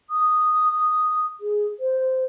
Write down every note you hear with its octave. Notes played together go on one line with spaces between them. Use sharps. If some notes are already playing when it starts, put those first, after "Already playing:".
D#6
G#4
C5